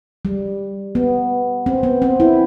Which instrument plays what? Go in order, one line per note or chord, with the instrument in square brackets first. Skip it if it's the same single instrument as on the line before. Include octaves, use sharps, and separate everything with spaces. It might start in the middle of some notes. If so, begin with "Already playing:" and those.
[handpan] G3
B3
C4
B3
C4
E4